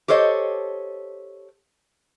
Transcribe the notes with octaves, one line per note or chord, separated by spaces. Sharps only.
G4 A4 C5 C#5 D#5